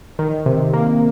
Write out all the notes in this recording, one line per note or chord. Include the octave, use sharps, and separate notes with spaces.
D#3
C3
A#3